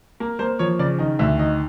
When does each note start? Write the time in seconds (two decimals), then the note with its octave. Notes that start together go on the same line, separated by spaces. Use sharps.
0.20 A#3
0.39 A#3 C5
0.59 F3 C#5
0.79 C#3 D5
0.99 D#3 D#5
1.19 D2 E5
1.38 D#3 D#5